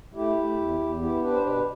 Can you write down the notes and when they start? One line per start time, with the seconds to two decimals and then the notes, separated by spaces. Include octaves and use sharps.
0.14 A3 E4 G4
0.36 A3
0.58 E2
0.79 E2
1.00 B3 E4 G4
1.21 D4 G4 B4
1.33 C5
1.42 B2 G4 B4